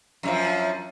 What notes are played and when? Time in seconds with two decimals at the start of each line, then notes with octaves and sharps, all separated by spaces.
0.23 F#2 D3 F3